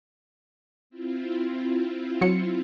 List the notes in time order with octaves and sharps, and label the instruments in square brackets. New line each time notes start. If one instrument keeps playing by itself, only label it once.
[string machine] C4 E4 F4
[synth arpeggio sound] F#3 C#7